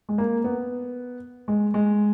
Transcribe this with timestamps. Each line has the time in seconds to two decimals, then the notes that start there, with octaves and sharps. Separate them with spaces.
0.09 G#3
0.18 A#3
0.44 B3
1.48 G#3
1.74 G#3